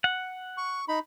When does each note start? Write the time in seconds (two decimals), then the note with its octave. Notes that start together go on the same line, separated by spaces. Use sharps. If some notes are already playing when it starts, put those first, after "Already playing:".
0.04 F#5
0.57 C#6
0.88 D#4 B5